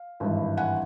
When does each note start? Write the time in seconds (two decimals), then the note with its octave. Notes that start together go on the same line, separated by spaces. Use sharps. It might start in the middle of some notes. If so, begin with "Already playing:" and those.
Already playing: F5
0.20 G#1 G2 E3
0.57 F#5 G#5